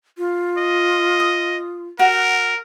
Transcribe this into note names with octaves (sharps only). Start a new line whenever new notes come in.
F4
D#5
D#6
F#4 A#4 F#5